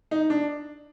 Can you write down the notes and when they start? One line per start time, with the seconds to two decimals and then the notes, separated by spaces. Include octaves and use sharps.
0.11 D#4
0.30 D4